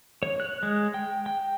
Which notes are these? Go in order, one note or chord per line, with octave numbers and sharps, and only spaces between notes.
C#5
F#6
G#3
G5
G5